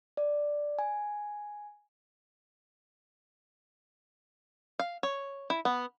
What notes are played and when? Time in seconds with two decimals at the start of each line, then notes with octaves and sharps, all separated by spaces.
0.17 D5
0.79 G#5
4.79 F5
5.03 C#5
5.50 E4
5.65 B3